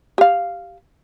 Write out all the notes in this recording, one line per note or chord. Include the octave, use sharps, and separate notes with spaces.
G4 F5